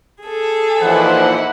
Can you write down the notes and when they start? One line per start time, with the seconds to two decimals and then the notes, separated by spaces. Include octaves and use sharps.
0.23 G#4 A4
0.81 A#2 E3 F3 D#4 E4 C5 F#5